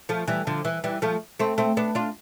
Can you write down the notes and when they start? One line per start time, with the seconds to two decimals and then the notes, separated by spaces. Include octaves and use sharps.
0.09 F3 A3
0.28 E3 G3
0.47 D3 F3
0.65 E3
0.84 E3 G3
1.02 F3 A3
1.39 A3 C4
1.58 A3 C4
1.77 B3 D4
1.95 D4 F4